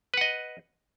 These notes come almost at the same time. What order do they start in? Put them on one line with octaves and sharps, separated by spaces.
B4 F#5 D#5